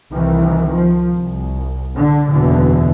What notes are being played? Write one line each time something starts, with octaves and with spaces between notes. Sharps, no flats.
C2 D#3 E3
F3
C2
D3
F#1 E2 B2 D3 E3